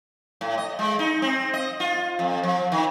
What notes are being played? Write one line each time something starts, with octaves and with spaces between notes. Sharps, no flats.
A2
D#5
G#3
D#4
C4
D#5
F4
F2
F3
D#3